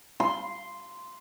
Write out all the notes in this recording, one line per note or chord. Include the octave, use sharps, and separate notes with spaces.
C6